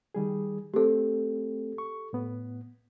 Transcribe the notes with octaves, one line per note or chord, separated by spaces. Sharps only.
D#3 G3 G#4
A3 C4 G4 A4
C#6
A2 B3